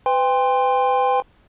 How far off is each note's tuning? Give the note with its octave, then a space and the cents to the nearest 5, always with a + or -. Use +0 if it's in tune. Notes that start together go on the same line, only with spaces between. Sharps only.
B4 +35 G5 +30 C6 +0